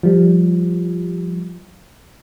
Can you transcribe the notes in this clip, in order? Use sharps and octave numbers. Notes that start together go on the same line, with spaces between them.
F3 G3